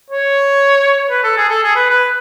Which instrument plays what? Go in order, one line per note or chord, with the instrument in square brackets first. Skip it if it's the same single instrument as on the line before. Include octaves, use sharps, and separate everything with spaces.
[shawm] C#5
B4
A4
G#4
A4
G#4
B4
B4